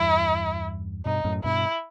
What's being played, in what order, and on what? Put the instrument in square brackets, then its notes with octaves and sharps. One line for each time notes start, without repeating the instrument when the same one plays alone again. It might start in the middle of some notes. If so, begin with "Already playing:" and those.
Already playing: [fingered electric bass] E2 G2 [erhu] E4
[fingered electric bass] G2 B2 [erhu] D#4
[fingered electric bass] F#2 A2
[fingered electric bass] G2 B2 [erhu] E4